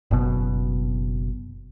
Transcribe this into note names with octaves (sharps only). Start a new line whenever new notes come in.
F#1 B2